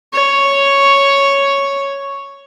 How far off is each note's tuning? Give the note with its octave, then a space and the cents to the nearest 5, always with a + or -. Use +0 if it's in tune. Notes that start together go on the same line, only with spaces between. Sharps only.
C#5 +0